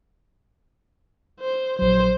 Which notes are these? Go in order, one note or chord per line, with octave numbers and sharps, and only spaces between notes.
C5
A#1 F#3 C5